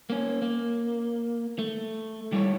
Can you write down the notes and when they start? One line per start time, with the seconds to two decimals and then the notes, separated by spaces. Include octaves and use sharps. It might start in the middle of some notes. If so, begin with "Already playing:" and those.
0.10 A#3 C#4
0.42 A#3
1.59 A3
2.33 G3 A3 E4 G#4 A4 C#5